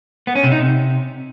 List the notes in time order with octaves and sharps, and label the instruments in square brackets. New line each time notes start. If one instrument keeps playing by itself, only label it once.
[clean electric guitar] B3
C#4
C3
D#4
C3